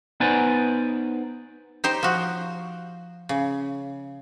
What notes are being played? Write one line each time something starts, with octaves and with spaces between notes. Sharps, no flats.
B3 D#4 B4 C5 D5 G#5
D#4 G4 C5
F3 F#4
C#3